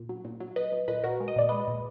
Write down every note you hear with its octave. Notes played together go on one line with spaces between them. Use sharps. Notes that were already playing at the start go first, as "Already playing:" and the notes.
Already playing: A#2
F#3
A#2
F#3
F#3 B4 D#5
F#3
A#2 B4 D#5
A#2 F#4 A#4
G#3
D#5
A#2 D5
G#3 B4 D#5
A#2